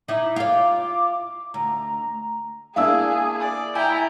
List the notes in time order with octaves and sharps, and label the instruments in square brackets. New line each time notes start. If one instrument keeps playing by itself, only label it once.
[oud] D#4 E4 [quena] D6
[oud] F4 F5 [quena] D6
[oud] D2 [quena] A#5
[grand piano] A#3 D4 E4 [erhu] G#4 [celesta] F5 E6
[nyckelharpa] D5
[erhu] E4 [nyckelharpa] G5 A#5 [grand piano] G#5